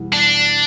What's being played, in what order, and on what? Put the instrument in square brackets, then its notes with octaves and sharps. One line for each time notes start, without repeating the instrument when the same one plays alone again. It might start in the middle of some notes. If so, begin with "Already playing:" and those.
Already playing: [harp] E2 B2 G3 E4
[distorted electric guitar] D4